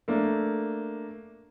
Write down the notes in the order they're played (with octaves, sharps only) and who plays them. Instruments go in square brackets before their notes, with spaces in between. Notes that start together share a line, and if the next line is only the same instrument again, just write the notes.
[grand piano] A3 A#3 D4